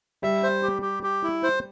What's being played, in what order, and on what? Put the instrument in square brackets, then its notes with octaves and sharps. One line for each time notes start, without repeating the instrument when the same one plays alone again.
[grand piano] G3 [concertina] E5
[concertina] C5
G4
G4
G4
E4
C5